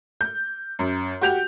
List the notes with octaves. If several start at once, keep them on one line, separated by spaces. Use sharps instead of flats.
G6
F#2
F#4 G4 G6 F7